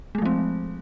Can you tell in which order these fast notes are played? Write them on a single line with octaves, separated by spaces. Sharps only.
G#3 A3 F3 C4